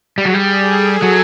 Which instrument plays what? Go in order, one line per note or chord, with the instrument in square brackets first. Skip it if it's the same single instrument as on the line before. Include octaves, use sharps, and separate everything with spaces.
[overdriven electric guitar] G3 [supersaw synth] G#4
[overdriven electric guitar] F#3
G3
[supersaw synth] A4
[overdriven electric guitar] F#3